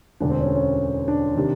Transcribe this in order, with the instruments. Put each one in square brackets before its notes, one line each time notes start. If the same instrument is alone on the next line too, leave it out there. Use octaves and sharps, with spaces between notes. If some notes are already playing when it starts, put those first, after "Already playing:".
[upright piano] E1 D2 D3 D4
C4
C#4
C4
C#4
D4
C3 D#3